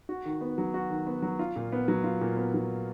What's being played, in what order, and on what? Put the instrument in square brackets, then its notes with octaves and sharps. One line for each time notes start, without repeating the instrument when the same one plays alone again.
[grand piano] F#4
D#3
B3
F#3
F#4
D#3
B3
F#3
F4
A#2
B3
F#3
F4
A#2
B3
F#3